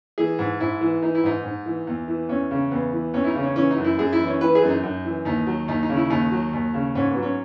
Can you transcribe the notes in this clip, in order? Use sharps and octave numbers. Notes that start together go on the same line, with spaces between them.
E3 G#4
G#2
G#2 E4
E3
E3 D#4
E4
G#2 D#4
G#2
E3
E2
E3
E2 C#4
C#3
E2 B3
E3
E2 C#4
E4
D#4
C#3
C#4
E3 C#4
D#4
F#2
E4
F#2 G#4
E4
E3
C#4
E3 B4
G#4
F#2
D#4
F#2
E3
D#2 D#4
F#3
D#2 D#4
D#4
C#3
E4
D#2 D#4
F#3
D#2
C#3
G#2 C#4
B3
F#3
C#4